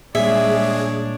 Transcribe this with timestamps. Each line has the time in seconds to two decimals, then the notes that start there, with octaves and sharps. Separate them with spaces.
0.15 A#2 G3 G#3 D4 G#4 C#5 E5